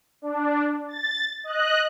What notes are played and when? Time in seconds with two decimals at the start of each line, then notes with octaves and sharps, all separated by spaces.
0.22 D4
0.88 A6
1.44 D#5 F#6